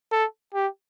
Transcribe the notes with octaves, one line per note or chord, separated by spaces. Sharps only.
A4
G4